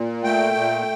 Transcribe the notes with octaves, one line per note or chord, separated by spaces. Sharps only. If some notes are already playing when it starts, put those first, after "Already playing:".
Already playing: A#2
A3 G5
A#2